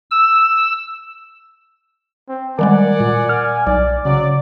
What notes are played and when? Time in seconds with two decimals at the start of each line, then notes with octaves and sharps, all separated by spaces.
0.11 E6
2.29 C4
2.59 D#3 G3 G#3 A#4 D5 F#5 G#5
3.00 A#2
3.29 F6
3.67 B1 D5
4.05 C#3 F#3 D5